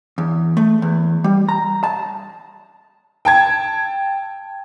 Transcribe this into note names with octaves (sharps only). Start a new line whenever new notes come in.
E2
A3
E2
G3
A#5
A5
G5 A5 G#6